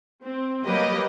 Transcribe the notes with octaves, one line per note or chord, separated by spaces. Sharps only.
C4
F#3 G3 A#3 G4 B4 D#5